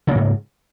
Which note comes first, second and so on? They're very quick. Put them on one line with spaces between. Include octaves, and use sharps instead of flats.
C#3 A#3 G#2